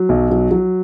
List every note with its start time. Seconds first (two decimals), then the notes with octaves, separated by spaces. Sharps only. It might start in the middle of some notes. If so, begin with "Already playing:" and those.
Already playing: F#3
0.09 B1
0.31 F#3
0.51 F#3